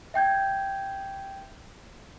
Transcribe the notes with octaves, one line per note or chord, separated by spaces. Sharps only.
E5 G5 G6 G#6